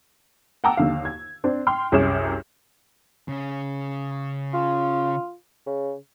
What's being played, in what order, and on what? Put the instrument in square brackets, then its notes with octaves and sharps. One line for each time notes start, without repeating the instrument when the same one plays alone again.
[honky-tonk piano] F#5 G5 A5 A#5 D6 E6
D#2 D3 F5
G#6
C4 D4
G5 C6 F6
C2 F#2 G#4 C#5 D6 E7
[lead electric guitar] C#3 C#4
[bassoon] F4
C#3